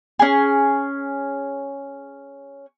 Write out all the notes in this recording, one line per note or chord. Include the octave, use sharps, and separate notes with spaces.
C#4 G#4